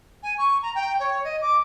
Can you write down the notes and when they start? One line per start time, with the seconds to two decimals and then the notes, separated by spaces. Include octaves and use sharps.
0.23 G#5
0.38 C#6
0.62 A#5
0.75 G5
0.99 C#5
1.24 D#5
1.41 D6